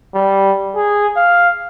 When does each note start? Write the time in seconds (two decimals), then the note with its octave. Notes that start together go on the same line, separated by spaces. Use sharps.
0.14 G3
0.75 G#4
1.16 F5